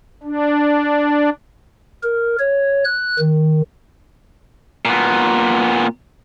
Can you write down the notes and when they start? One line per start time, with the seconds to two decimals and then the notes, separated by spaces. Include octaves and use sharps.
0.23 D4
2.03 A#4
2.39 C#5
2.84 F#6
3.19 D#3
4.85 A#2 B3